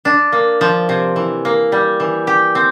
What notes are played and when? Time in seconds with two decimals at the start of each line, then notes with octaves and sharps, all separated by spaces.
0.05 D4
0.32 A#3
0.61 F3
0.89 C3
1.16 E3
1.45 A#3
1.72 G3
2.00 E3
2.27 G4
2.55 C4